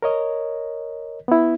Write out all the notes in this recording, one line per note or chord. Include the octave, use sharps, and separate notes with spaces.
A#4 C#5 D#5
B3 E4